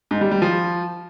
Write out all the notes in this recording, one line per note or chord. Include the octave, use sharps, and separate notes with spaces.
G#2
G3
G3
F3